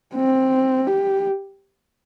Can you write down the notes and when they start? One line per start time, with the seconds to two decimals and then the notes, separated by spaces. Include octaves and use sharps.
0.15 C4
0.87 G4